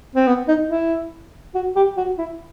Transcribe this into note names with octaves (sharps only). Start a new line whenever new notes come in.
C4
B3
D#4
E4
F#4
G4
F#4
E4